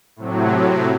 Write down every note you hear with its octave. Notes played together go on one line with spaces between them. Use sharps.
A2 C3 F#3